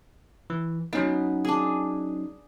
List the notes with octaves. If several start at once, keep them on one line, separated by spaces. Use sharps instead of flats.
E3
F#3 B3 C#4 D#4
D4 G#4